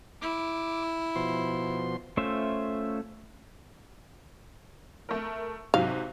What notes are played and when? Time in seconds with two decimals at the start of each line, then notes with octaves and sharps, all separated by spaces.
0.22 E4 D6
1.15 B2 F3 C6
2.17 A3 C#4 F4 C5 E5
5.09 A3 A#4
5.74 G#2 C3 F#3 F5